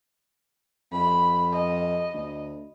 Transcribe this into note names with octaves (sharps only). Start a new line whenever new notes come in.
F2 B5
D#5
D2